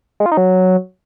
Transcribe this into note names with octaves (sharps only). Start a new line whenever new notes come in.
G#3
F4
D#4
F#3